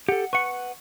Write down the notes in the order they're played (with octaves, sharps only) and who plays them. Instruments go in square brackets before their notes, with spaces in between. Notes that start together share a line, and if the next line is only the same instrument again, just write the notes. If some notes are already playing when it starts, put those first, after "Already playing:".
[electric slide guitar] G4 A4 [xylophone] F#5
[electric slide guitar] B4 F#5 [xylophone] C#6 C#7